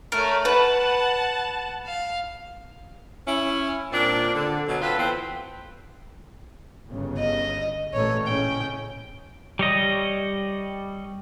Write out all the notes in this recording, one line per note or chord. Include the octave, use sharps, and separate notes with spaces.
A3 A#4 C#5
B4 F#5 A5
F5
C#4 E4
A#2 C4 D4
D3
B2 F#3
C4 F4 A4 B4
E3 B3 C4
G1 C#3
D#5
A1 A#2 A3 C#5
A2 C#3 C#4 G5
G3 C#5 D#5